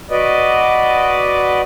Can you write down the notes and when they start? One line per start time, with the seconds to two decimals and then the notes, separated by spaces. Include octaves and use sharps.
0.11 F#4 B4 D5 D#5